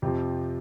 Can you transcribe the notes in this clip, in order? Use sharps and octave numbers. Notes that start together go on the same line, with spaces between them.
F2 C3 F3 G4